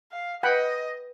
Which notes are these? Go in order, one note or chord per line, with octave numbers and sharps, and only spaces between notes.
F5
B4 D#5 F#5 G5 B5